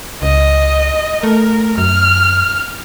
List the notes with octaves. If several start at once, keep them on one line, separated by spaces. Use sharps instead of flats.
C#2 D#5
A3 A#4
F#2 F6